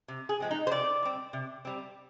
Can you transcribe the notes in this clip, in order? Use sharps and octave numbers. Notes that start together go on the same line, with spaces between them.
C3
G#4
F3 G#3 C4
D#4
C5
C3 D5
G3 C4
C3
G3 C4